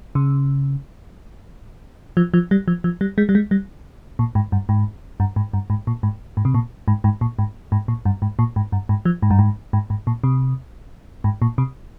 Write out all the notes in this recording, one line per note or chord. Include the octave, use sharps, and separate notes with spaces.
C#3
F3
F3
G3
F3
F3
G3
G#3
G3
G#3
G3
A#2
G#2
G2
G#2
G2
G#2
G2
G#2
A#2
G#2
G#2
C3
A#2
G#2
G#2
A#2
G#2
G#2
A#2
G2
G#2
A#2
G#2
G2
G#2
F3
G#2
G2
G#2
G#2
G#2
A#2
C3
G#2
A#2
C3